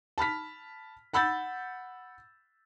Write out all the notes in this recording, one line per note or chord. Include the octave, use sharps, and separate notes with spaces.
A5 B5 F6 B6
F#5 B5 E6 G6 A6